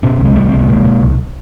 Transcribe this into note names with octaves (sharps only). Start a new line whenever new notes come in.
B2 B3 C#4
C2 G#3
C2 G3 A3
C2 C4
B3
B2 G#3 A#3
B2
C2